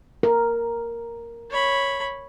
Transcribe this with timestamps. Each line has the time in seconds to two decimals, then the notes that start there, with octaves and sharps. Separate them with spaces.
0.23 A#4
1.50 C#5 B5